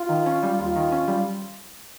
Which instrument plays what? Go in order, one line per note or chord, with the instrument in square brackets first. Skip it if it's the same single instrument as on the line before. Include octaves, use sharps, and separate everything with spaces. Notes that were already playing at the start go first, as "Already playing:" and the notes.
Already playing: [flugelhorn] F4
[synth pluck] D#3
C#4
G3
[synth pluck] D#2 [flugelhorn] F4
[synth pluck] D#3
C#4
G3